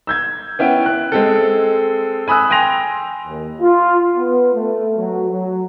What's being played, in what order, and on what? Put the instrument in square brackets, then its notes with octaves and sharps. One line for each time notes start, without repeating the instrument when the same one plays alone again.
[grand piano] E6 G6 G#6
B3 C#4 E4 G5
F#6
G#3 C4 A4
G#5 B5 D#6 E6 F#6
G5 G#5 C6 A#6 F7
[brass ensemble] D#2
F4
B3
A3
F#3
F#3